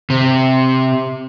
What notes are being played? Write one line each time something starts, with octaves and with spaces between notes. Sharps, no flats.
C3